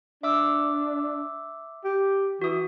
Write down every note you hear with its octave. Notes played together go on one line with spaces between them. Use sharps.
D4 E5 D6 E6
G4
E3 F#4 D#6